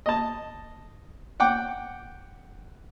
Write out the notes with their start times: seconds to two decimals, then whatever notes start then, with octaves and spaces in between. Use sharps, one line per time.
0.06 D#5 A5
1.40 F#5 G5 D6